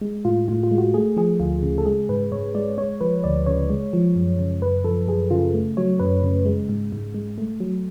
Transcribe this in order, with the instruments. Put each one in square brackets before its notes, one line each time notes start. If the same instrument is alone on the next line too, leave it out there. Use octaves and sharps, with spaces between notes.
[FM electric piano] G#3
A2 F4
A2 F4
F4
G#3
F#4
A3 G#4
F3 G#4
D2 F4
C#3
A4
G#3 G#4
G#2 B4
G#2 C#5
G#3 D5
G#3 C#5
F3 B4
D2 D5
C#3 C#5
G#3
F3
F#2
C#3
F#2 B4
F3 A4
F#2 G#4
C#3 F4
A3
F#3 C#5
F#2 B4
C#3
G#3
G#2
G#2
G#3
A3
F#3